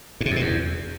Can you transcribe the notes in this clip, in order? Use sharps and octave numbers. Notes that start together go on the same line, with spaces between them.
G#2
C3
F2
B2
E2